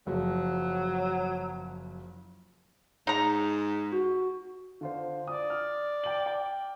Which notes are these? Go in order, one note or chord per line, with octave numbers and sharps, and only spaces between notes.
F#1 F3 F#3
G#2 D#4 A#5
F#4
D3 F4 C5
D5 D#6
F6
G5 F#7
G5